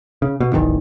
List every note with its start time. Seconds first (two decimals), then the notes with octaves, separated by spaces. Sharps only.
0.22 C#3
0.40 B2
0.53 D1 A1 E2 D#3